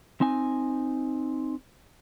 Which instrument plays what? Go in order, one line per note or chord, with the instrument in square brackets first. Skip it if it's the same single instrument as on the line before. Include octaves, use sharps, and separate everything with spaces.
[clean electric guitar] C4 D#4 G#5